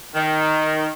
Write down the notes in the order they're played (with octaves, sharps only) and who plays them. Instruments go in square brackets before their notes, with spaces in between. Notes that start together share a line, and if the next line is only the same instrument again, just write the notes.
[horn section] D#3